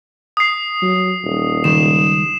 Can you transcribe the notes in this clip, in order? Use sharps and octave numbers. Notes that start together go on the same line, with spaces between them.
D#6 C7
F#3
D#1
C#2 D#3 G3 E7